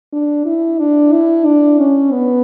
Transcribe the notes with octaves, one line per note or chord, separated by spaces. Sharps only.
D4
E4
D4
E4
D4
C#4
B3